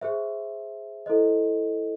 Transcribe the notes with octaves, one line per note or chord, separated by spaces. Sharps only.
G#4 C5 E5
E4 A4 C5 D#5